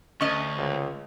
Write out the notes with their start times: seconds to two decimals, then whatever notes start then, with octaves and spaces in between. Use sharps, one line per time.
0.21 D2 C#4 D#5 C#6
0.57 C#2